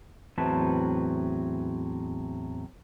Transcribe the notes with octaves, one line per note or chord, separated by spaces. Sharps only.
E2 A2 F#3 C4 B4 A5